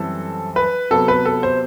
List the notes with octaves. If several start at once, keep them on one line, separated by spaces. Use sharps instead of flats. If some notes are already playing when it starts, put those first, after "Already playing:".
Already playing: F#2 E3 G3 C4 A4
B4
C3 F#3 B3 A4
B4
A4
C5